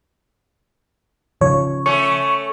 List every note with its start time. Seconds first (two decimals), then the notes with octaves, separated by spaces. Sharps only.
1.41 C#3 F3 C#5
1.86 A3 C#4 C#6